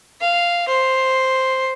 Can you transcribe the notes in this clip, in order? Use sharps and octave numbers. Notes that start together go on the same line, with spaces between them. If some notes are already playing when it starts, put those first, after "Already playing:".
F5
C5